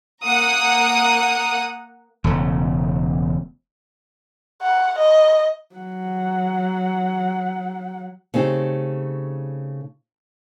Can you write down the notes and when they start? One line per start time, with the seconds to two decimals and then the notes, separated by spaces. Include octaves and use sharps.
0.24 A#3 F#5 A#5 D#6
2.24 E1 C#3 A3
4.62 F#5
4.98 D#5
5.75 F#3 F#5
8.34 C#3 A3 C4 D#4 G4